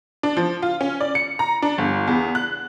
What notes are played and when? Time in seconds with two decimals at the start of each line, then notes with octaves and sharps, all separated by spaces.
0.23 D4
0.37 F3
0.62 F4
0.81 C#4
1.01 D5
1.15 C#7
1.39 A#5
1.62 D4
1.78 G1
2.07 E2
2.35 F#6